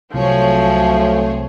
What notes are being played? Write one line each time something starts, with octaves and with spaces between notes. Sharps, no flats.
C2 F3 F#3 A3 C4 G#4 C#5